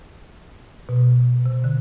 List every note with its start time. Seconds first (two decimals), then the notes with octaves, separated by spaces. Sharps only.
0.89 B2
1.46 C3
1.64 D3